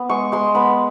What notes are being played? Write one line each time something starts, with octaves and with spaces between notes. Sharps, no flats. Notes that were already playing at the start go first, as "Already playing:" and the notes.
Already playing: B3
G#3 C#6
G#3 C6
B3 B5